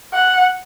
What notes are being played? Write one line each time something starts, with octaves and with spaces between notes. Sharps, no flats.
F#5